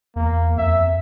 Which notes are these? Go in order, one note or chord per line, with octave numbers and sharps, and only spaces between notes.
E2 A#3
F2 E5